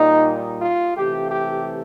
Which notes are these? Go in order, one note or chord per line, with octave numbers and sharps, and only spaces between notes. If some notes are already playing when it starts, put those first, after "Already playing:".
Already playing: A#2 G3 D#4
F4
C3 E3 A3 G4
G4